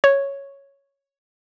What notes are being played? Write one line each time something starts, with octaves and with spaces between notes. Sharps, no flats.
C#5